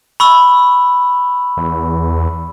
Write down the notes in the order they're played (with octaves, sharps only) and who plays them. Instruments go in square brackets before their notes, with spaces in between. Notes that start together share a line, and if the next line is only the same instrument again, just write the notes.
[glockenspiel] B5 C#6 E6
[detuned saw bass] E2